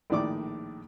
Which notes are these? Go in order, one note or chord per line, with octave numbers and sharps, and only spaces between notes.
A#1 A2 D#3 D5 D6